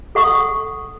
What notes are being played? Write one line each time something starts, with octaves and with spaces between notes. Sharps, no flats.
A4 F#5 C#6 D#6